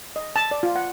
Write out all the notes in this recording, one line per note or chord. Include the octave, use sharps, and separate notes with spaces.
D#5
A5
D5
F4
F#5